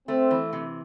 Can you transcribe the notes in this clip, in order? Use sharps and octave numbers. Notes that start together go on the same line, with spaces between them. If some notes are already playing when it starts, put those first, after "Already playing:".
A3 C4
E3
C3